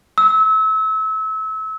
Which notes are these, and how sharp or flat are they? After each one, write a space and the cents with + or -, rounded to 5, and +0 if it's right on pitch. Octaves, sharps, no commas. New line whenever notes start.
E6 -30